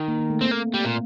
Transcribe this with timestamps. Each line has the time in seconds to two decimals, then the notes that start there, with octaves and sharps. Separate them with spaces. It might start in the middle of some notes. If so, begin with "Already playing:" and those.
Already playing: D#3
0.08 A#3
0.19 A#3
0.30 A3
0.41 A#3 C4
0.51 A#3 C4
0.74 G3
0.85 A#2